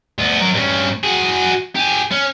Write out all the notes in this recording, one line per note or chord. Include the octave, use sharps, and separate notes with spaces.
D2 B3
F#3 A#4
G2 C#4
F#4 G#4
G4 G#4
C#4